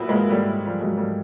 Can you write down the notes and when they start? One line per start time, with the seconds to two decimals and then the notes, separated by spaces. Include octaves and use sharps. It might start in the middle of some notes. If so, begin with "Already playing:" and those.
Already playing: A#2 F#3 B3 E4
0.09 G#3 A#3
0.29 G3 A3
0.65 F3 G3
0.81 F#3 G#3
0.97 G3 A3